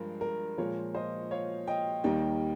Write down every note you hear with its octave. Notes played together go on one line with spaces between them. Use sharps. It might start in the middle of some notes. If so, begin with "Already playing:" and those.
Already playing: G2 F3 G#3 A#4
A#4
A#2 F3 G#3 A#4 C#5
C5 D#5
C#5 F5
D#5 G5
D#2 D#3 G3 A#3 D#5 G5